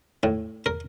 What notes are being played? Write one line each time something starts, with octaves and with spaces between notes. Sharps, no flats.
A2
A#4